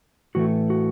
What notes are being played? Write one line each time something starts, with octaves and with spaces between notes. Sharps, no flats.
A2 E3 A3 F#4
F#4